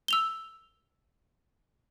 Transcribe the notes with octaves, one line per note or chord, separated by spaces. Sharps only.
E6 F7 G7